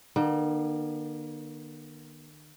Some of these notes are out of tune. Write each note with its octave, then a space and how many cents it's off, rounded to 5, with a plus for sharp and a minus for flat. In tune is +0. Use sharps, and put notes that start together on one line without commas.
D#3 -45 A#3 +40